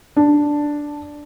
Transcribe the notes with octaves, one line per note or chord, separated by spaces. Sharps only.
D4